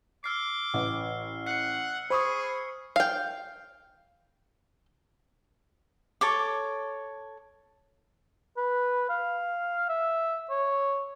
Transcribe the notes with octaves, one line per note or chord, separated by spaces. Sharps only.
D6 E6 F6 C7
A1
F#5 C7 C#7
G#4 C5 B5 C#6 D#6
F5 G5
A4 C#5 D6
B4
F5
E5
C#5